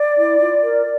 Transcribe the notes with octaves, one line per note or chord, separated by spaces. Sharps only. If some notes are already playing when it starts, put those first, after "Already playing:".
Already playing: D5
E4
F4
A#4